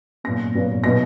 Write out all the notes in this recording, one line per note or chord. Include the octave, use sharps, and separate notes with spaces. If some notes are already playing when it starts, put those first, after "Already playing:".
A#2 F#3 B3 A#6
A#2 F#3 B3
B2 F#3 B3 A#6